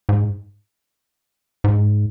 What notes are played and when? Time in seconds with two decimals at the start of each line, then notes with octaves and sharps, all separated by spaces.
0.09 G#2
1.64 G#2